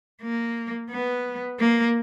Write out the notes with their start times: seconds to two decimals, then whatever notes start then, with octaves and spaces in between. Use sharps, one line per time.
0.22 A#3
0.91 B3
1.60 A#3